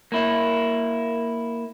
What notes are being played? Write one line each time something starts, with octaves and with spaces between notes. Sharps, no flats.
A#3 E4